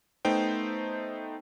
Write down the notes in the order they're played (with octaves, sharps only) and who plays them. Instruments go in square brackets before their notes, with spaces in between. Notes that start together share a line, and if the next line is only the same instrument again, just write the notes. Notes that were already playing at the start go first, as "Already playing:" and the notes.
[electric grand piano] A3 B3 D#4 C5 G5